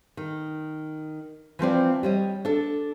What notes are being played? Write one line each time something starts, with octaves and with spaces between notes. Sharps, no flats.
D#3
E3 F3 C4 D5
G3 C#5 D#5
D4 A4